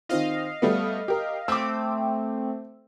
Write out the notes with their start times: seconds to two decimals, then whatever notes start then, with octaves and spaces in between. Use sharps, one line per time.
0.09 D#3 C4 F4 D#5 F5
0.62 G3 A3 B3
1.08 G4 A#4
1.48 A3 C4 D6 E6